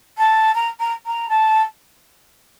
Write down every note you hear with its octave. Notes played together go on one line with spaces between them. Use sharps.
A5
A#5
A#5
A#5
A5